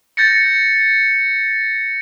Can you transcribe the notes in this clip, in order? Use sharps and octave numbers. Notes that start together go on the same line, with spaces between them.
G6 A6 A#6 C#7